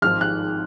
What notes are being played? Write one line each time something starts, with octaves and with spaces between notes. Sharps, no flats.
G#1 G#2 F3 F6
F#6